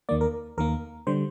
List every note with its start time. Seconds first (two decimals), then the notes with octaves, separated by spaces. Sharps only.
0.09 D#2 D#3 A#3 D5
0.21 A#4
0.58 D#2 D#3 A#3 A#4
1.07 D3 G3 C5